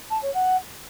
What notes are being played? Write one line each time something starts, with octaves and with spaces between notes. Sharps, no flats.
A5
C#5
F#5